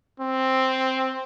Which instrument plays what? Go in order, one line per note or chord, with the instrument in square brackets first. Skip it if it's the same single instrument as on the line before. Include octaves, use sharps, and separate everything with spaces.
[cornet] C4